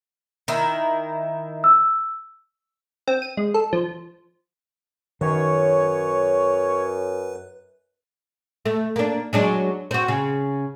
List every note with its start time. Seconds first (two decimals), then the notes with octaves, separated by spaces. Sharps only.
0.48 D#3 E4
1.64 E6
3.08 C4
3.22 D#7
3.37 G#3
3.54 A4
3.73 F3
5.21 F#2 D#3 B4 C#5
8.65 A3
8.96 A#3 D4
9.33 F#3 G#3 D4
9.91 C4 F#4
10.08 C#3